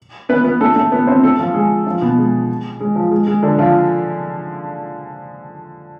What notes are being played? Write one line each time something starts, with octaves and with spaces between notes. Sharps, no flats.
B3 B4
B3 B4
A3 A4
A3 A4
B3 B4
C4 C5
A3 A4
F3 F4
G#3 G#4
F3 F4
B2 B3
G#3
G#3
F3
G#3
G#3
D3 D4
F3 F4